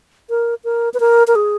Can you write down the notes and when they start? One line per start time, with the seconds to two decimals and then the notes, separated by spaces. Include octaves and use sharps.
0.30 A#4
0.64 A#4
0.94 B4
1.00 A#4
1.27 A#4
1.36 G#4